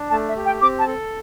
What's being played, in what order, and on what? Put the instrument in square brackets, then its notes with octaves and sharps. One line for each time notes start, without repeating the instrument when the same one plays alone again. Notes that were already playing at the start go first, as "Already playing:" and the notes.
Already playing: [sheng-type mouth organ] D4
[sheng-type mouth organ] A3 [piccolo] A5
[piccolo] E5
[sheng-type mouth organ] G4
[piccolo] G5
[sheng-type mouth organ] C4 [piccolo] D6
[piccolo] A5
[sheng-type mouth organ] A4